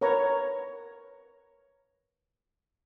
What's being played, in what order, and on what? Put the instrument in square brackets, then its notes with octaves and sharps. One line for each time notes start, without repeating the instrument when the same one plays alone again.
[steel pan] A#4 B4 C#5 A#5